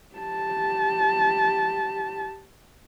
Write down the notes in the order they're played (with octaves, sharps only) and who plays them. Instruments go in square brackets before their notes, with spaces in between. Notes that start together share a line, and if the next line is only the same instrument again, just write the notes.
[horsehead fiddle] G4 A5